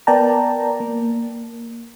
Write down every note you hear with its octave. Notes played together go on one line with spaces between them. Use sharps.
B3 A#4 D5 G5 A5 A#5
A#3